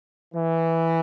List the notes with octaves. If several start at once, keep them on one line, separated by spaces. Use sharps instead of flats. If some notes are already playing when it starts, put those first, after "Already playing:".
E3